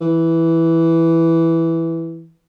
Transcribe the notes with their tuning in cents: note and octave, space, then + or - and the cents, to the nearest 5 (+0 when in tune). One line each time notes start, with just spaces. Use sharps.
E3 +0